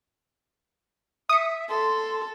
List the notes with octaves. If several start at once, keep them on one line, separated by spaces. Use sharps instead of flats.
E5 D#6 C#7
A4 C6